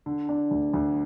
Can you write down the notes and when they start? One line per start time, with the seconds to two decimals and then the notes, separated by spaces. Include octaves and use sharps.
0.06 D3
0.29 D4
0.51 D2
0.74 D2